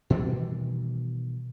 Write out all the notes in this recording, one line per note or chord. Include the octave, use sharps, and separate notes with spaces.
B2 D#3 E3 G3